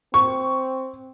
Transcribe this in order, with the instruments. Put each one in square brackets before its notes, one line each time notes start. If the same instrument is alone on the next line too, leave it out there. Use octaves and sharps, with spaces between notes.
[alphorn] C4 [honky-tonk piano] C#6